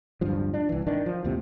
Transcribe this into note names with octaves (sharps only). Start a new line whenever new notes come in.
D1 G2 F3
D4
C2 E3
G#1 D#3 D4
F3
D#2 A2 C3